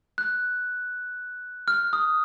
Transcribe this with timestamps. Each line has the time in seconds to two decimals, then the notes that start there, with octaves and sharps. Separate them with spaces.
0.18 F#6
1.68 F6
1.93 D#6